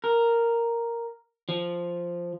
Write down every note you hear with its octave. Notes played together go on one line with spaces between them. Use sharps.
A#4
F3